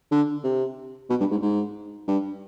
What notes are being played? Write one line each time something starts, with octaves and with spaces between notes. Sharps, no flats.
D3
C3
B2
G2
G#2
G#2
G2